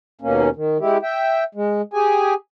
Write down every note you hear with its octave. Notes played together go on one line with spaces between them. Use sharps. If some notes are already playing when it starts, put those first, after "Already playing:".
D#2 B2 A#3 C#4
D#3
G#3 E4 G4
E5 G5
G#3
G4 G#4 G#5